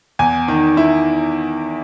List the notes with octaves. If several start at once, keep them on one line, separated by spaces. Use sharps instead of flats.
E2 G#5
D#3
E4